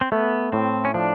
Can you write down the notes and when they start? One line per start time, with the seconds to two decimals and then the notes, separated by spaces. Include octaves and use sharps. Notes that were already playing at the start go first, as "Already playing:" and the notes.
0.01 C4
0.12 A3 B3
0.52 A2 C4
0.85 C#4
0.94 F3 D4